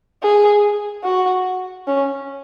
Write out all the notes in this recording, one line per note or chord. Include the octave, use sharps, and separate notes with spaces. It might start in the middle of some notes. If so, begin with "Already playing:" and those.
G#4
F#4
C#4